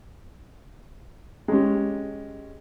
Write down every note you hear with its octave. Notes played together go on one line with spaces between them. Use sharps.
G#3 C#4 G4